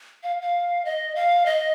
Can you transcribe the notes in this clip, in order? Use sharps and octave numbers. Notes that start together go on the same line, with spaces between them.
F5
F5
D#5
F5
D#5